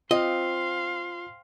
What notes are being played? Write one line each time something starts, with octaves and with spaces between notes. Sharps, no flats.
C4 F4 D#5 F5 C6